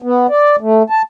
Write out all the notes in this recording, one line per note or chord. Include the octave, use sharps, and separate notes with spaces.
B3
D5
A3
A5